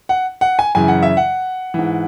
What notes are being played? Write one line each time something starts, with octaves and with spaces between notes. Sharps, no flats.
F#5
F#5
G#5
F#2 C#3 E3 G#5
F#5
E5
F#5
G#2 E3